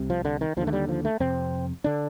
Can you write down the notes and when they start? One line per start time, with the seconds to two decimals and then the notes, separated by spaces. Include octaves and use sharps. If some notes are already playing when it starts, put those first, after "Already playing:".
Already playing: C2 C3
0.10 F3
0.25 D3
0.41 D#3
0.57 D#2 D3 F3
0.67 A3
0.73 G3
0.89 F3
1.05 A3
1.20 F2 C3 C4
1.84 D3 D4